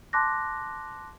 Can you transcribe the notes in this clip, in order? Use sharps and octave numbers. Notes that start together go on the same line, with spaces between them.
A5 C6 D6 F#6 A#6